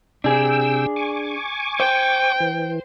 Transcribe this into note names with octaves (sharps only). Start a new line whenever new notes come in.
C3 D4 G#4 G5 E6
G#5 C#6 D6
C5 G5
E3